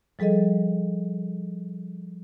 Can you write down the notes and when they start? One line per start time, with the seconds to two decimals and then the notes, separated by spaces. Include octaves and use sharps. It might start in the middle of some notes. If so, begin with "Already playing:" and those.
0.19 F3 G3 G#4 A4 D#5